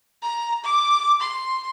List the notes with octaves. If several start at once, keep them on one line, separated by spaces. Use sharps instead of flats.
A#5
D6
C6